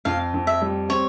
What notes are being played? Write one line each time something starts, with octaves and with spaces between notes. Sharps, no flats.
F2 F5
F2
E5
G3
C4 C#5